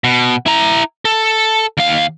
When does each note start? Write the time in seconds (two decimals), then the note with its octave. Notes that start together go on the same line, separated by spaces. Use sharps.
0.04 B2
0.46 E4 A#5
1.05 A4
1.77 D#2 F5